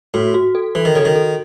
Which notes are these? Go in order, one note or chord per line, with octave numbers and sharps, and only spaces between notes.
A2 F#4
F#4
A4
E3 A4
D#3
C#3 A4
D#3
A4